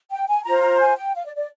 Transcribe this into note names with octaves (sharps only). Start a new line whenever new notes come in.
G5
G#5
F4 C5 A#5
A#5
G#5
G5
F5
D5
D5